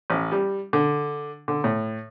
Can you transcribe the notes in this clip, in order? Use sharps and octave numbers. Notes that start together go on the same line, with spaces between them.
A1
G3
D3
D3
A2